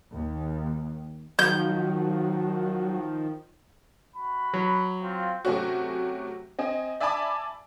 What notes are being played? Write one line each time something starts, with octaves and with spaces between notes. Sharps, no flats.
D#2
D#3 F3 F#3 G6
F#4 B5
F#3
C4 F4
C3 F#3 A3 C4 C#4 F#4
C4 D#5 G#5
D5 E5 G#5 A5 B5 D6